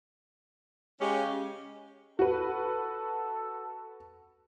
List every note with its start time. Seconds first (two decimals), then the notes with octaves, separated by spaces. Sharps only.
1.00 C#3 G#3 C#4 G4
2.19 F#4 A4 B4